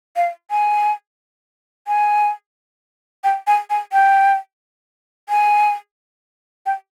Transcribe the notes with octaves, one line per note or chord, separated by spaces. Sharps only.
F5
G#5
G#5
G5
G#5
G#5
G5
G#5
G5